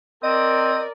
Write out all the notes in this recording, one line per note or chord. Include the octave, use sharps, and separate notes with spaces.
C4 A#4 D5 D#5